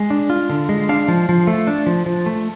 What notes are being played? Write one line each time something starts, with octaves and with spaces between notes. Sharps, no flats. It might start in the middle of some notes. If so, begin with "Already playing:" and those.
Already playing: G#3
D4
F4
D3
G#3
D4 F5
F3
F3
A3
D4
F3
F3
A3